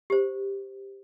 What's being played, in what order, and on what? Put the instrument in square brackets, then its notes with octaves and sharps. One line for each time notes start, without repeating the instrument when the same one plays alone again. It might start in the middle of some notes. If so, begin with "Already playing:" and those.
[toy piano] G4 C5